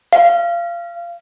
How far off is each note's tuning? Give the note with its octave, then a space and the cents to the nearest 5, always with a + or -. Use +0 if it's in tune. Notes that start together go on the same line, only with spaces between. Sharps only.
F5 -25